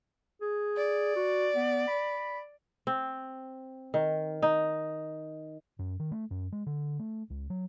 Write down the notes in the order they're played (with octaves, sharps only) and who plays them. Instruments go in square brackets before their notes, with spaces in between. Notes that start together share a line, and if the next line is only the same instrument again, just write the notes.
[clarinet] G#4
[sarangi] D5
[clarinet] F#4
B3
B5
[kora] C4
D#3
D#4
[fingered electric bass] F#2
D#3
A3
F#2
G#3
D3
A3
C#2
F#3